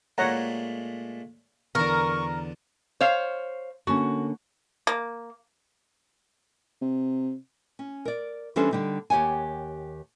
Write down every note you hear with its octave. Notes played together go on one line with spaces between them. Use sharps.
A#2 G#3 A3 C#5 F#5 A#5
E2 D3 A#4 C#6
C5 C#5 F5
D3 A#3 C#4 F#4
A#3
C3
C#4
A#4 D5
E3 G3 C#4 D4 A4 C5
D3 G3 D#4
D#2 G4 C#5 F#5 G#5